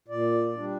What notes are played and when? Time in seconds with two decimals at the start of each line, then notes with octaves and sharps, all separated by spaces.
0.08 A#2 D5
0.56 G3 D4